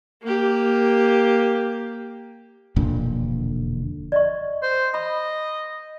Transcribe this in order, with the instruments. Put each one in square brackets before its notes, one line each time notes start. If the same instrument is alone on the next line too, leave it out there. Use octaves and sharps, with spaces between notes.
[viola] A#3 G4
[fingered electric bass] E1 F2 A#2 D3
[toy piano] D5 D#5 C#6
[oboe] C5
[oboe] D#5 [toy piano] B5